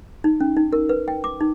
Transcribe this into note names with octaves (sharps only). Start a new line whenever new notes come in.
D#4
C#4
D#4
A#4
B4
G5
D6
D#4